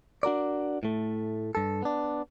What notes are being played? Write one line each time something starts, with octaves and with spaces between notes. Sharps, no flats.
D4 F#4 A#4 D5
A2 A3
G2 A4
B3 D4